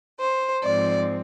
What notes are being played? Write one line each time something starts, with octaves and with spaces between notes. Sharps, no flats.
C5
G#2 F3 C4 D5